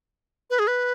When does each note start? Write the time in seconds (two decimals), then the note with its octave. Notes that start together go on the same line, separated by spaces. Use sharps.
0.50 B4
0.59 G#4
0.68 B4